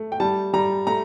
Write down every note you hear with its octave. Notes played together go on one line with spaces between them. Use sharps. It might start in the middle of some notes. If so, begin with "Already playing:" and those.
Already playing: A3
G5
G3 A5
G3 A#5
A3 A#5